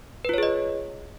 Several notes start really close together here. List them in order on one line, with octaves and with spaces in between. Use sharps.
B4 F4 C#5 G#4 D#5